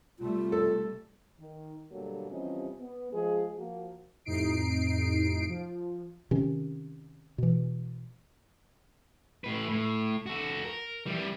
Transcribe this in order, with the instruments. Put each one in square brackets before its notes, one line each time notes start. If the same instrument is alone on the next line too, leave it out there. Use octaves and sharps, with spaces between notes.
[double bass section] C3 G3 A3 [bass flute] F4
[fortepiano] A4
[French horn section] D#3
B2 D3 F#3 G3 A#3 A4
C3 E3 F3 G3 C#4 D#5
B3
F3 G#3 G#4
F3 A#3 F#4
[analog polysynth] F2 A2 C3 D#4 C7 D7
F3
[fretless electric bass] C3 D#3 C#4
B2 E3
[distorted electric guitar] A2 B4
A2
F#4 A4
A#4
E3 G3